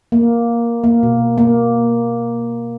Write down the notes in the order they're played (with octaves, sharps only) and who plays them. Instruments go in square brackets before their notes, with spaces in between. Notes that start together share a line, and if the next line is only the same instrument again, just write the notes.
[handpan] A#3
A#3
B2
A#3